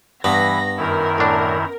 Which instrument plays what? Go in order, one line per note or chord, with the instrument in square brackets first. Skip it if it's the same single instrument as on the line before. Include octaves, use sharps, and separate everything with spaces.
[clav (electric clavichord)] G2 [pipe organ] E3 B5 [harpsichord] B3 [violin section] A#6
[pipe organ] F#2 D#3 E4 [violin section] A#4
[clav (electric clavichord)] A2 D4